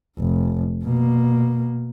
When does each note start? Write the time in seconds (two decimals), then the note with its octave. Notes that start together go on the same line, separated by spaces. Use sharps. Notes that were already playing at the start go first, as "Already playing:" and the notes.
0.18 F1
0.84 B2 A#3